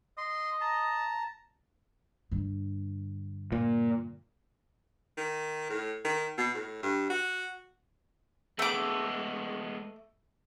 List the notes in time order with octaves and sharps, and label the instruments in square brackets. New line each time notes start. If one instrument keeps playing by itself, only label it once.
[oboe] D#5 [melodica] C6
[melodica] A5 A#5
[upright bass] G2 D3
[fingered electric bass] A#2
[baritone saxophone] D#3
A2
D#3
B2
A2
G2
F#4
[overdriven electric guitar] G#3 B3 [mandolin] A3 D6